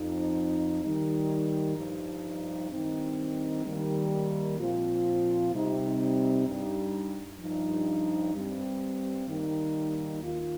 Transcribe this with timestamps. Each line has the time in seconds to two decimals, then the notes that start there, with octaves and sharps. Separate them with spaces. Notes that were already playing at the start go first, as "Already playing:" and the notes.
Already playing: F2 F3 D#4
0.83 D#3 G3 D#4
1.77 G2 F3 D#4
2.71 G2 D#3 C4 D#4
3.65 D#3 G3 A#3
4.58 A#2 F3 C4 F4
5.52 C3 G3 D#4
6.47 G2 G3 D#4
7.41 G2 F3 D#4
8.35 G2 G3 C4
9.28 D#3 G3 A#3 D#4
10.22 D#2 D#3 A#3 F4